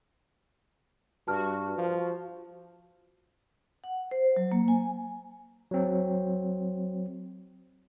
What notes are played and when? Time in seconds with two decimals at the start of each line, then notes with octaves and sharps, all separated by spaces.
1.28 G2 F#4 A5 F6
1.78 F3
3.84 F#5
4.11 C5
4.36 F#3
4.52 A#3
4.68 G#5
5.71 F#3 C4